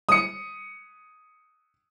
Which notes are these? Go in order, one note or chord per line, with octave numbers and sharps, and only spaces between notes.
D#6 C#7